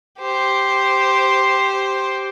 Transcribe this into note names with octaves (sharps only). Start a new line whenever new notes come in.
G4 C5